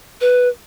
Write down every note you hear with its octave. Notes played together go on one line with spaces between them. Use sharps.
B4